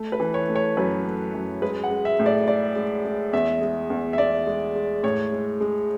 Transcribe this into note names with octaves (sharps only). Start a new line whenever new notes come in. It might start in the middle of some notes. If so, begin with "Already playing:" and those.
Already playing: A3
B4
E3
C#5
A3
C#5
F#2 B4
A3
F#2
G#3 B4
F#5
G#3
E5
A2
D5
G#3 D5
G#3
G#3
E2 E5
G#3
E2
E5
E2 D5
G#3
G#3
A2 C#5
G#3
G#3